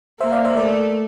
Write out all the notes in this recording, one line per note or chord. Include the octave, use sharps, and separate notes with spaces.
A#3 C5 E5
D5 F5
C5 E5
A3 A#4 D5